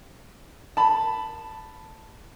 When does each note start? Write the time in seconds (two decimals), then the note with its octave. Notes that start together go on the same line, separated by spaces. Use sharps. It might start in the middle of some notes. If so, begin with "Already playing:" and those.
0.77 A5 B5